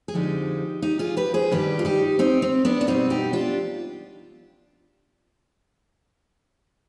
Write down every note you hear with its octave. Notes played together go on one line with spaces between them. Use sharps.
G#4
F2 D3 F3 G#3 D#4 G4
D#4 G4
F4 G#4
G4 B4
G#4 C5
G2 D#3 G3 G4 B4
F4
D#4 G4
C4 D#4
C4
B3 D4
D4
B2 G3 C4 D#4
D#4 G4
D4 F4